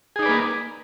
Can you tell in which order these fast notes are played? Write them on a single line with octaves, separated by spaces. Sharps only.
G#4 D#4 D5 B4 A#3